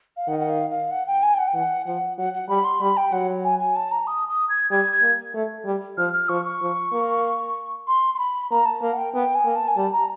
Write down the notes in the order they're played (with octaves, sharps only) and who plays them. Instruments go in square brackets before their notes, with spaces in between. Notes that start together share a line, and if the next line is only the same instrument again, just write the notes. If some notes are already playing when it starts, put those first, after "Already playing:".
[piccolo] F5
[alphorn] D#3 [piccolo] F#5
[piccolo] F#5
F5
F5
F#5
G5
G#5
G5
F#5
G5
[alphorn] E3 [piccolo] F#5
[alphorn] F3 [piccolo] F#5
[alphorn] F#3 [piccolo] F#5
[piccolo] F#5
[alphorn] G3 [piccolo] B5
[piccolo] C6
[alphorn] G3 [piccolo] B5
[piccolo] G5
[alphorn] F#3 [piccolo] F#5
[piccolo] G#5
G#5
A5
A#5
D#6
D#6
G#6
[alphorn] G3 [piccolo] G#6
[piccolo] G#6
[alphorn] A#3
A3
G3
[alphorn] F3 [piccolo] F6
[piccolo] F6
[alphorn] F3 [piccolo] C#6
[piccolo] C#6
[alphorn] F3
A#3
[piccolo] C6
C6
B5
[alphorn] A#3 [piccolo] A#5
[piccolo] A5
[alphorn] A#3
[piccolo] F#5
G5
[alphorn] B3 [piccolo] G5
[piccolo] G#5
[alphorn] A#3
[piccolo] A5
G#5
[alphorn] G3 [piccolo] A5
[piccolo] A#5